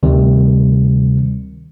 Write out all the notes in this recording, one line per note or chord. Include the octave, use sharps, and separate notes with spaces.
D2 C3 D#3 G3